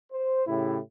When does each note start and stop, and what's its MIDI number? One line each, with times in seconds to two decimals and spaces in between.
0.12 0.42 72
0.47 0.79 45
0.47 0.79 49
0.47 0.79 64
0.47 0.79 67